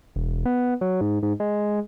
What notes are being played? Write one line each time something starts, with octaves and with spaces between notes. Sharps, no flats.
E1
B3
F#3
G#2
G#2
G#3